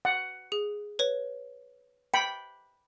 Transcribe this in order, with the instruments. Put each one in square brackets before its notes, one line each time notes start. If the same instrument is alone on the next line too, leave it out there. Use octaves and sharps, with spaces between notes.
[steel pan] F#5
[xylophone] G#4
B4 C#5
[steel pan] G5 B5 [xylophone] C#7